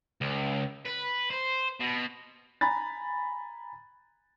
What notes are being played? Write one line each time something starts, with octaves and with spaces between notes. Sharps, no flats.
C#2
B4
C5
B2
G#5 A#5 B5 A6